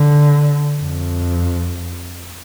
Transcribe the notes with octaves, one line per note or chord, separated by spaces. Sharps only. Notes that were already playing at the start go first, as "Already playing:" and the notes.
Already playing: D3
F2